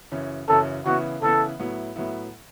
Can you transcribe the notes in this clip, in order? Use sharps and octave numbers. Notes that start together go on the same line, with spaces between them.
F#2 C#3 E3 C#4
F#2 C#3 E3 C#4 A4
C#3 E3 B3 E4 F#4
C#3 E3 B3 E4 A4
A2 F#3 B3 E4
A2 F#3 B3 E4